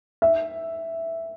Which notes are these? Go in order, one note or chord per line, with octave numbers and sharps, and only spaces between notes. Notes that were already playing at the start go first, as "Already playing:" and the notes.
E5